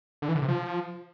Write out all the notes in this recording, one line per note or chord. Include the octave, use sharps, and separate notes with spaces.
D3
E3
D3
C3
F3